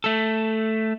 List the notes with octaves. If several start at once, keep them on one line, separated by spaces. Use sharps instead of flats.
A3 A4